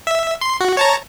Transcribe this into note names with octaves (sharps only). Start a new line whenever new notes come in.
E5
C6
F#4
C#5 A5 A#5